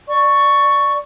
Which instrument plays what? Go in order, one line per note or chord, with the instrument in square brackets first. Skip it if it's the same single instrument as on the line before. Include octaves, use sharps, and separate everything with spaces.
[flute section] D5 C#6